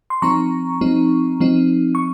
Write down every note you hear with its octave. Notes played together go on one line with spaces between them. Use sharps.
C6
F3 C4 D#4 A#5 C#6
F3 C4 D#4
F3 C4 D#4
C#6